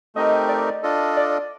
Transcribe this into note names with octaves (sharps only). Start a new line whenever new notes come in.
A3 C4 D#4 G4 A#4 D#5
D5
D4 F4 A4 D#5
D5